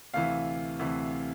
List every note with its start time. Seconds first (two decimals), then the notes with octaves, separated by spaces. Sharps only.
0.14 D2 C3 E3 F5
0.79 D2 C3 E3